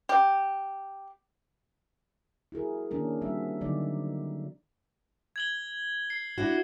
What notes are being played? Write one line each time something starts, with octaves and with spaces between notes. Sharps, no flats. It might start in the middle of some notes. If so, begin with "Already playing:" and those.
G4
E4 F#4 G#4 A#4
D#3 A#3 C#4 D4 A#4
G3 C4 F#4 E5
D3 D#3 F#3 D#4 D5
G#6 F#7 G7
C7
D4 E4 F#4